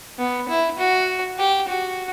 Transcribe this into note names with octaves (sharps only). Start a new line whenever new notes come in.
B3
E4
F#4
G4
F#4